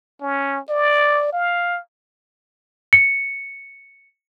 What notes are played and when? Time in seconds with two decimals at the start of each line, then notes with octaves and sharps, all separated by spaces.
0.22 C#4
0.70 D5
1.32 F5
2.93 C#7